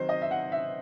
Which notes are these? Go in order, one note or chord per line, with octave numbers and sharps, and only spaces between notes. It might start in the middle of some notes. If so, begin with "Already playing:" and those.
Already playing: D#3 F#3 C4 C5
D#5
E5
F#5
E5